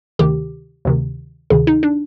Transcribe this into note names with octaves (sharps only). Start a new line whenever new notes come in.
D2 C3 D#3 G4
D2 C3 D#3
D2 C3 D#3 G#4
D#4
D4